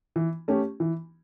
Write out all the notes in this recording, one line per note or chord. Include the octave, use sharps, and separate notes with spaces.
E3
A3 C#4 G4
E3